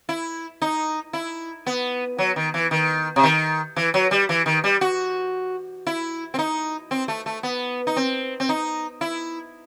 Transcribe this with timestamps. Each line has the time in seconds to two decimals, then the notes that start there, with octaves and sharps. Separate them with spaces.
0.09 E4
0.62 D#4
1.13 E4
1.66 B3
2.18 F#3
2.36 D#3
2.54 E3
2.71 D#3
3.16 C3
3.24 D#3
3.76 E3
3.94 F#3
4.11 G3
4.29 E3
4.46 D#3
4.64 G3
4.81 F#4
5.87 E4
6.34 C4
6.39 D#4
6.91 C4
7.08 A3
7.26 A3
7.43 B3
7.87 D#4
7.96 C4
8.40 C4
8.49 D#4
9.01 E4